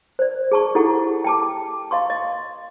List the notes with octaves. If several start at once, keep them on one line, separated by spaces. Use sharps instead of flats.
C5 D5
G#4 A5 C#6
E4 G4 A4 F#5
G5 A5 D6
D#5 F5 C6 C#6
D#5